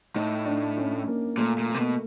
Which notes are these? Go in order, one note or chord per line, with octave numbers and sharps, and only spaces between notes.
A2 D#4
D4
C#4
A#3
A#2 A3
A#2
A#3
C3
B2